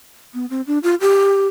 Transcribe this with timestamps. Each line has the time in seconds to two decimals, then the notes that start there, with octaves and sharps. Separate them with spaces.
0.34 B3
0.50 C4
0.67 D4
0.83 F4
1.01 G4